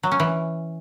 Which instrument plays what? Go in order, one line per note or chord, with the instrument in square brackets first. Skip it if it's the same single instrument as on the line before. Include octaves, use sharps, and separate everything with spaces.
[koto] F#3
C#4
E3